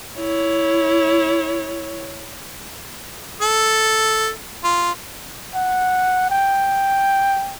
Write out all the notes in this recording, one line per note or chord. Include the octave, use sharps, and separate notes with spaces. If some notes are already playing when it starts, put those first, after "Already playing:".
E4 C#5
A4
F4
F#5
G5